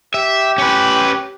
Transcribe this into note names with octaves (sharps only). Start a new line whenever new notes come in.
G4 E5
C#4 B4